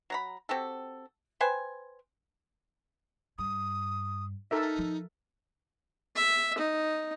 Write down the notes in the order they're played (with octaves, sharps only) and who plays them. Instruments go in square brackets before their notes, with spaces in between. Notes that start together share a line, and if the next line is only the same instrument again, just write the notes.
[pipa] F#3 A#5 B5
C4 F#4 G4 A4
B4 C5 G5 G#5
[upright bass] G2 [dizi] D#6
[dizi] D#4 [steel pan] A4 A#4 E5
[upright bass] F3
[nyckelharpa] E5
D#4